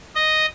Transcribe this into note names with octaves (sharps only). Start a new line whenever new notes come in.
D#5